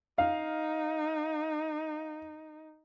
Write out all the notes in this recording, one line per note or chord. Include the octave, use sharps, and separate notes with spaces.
D#4 F5